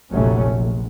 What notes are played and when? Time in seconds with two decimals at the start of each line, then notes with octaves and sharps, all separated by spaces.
0.11 F1 A#1 A#2 F#3 A3 C#4
0.53 A#1